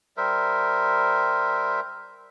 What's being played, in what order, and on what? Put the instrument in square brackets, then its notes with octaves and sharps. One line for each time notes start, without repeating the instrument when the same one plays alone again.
[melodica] G3 A#4 C5 E5